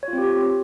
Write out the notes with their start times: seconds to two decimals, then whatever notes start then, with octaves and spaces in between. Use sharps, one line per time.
0.03 C#5
0.08 F4
0.13 C4
0.18 G4